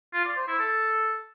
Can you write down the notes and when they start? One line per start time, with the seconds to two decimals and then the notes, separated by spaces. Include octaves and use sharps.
0.14 F4
0.25 D5
0.36 C5
0.48 E4
0.59 A4